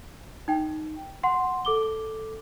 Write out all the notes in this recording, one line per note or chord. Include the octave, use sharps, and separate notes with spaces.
D#4 G5
F#5 C6
A4 D6 G7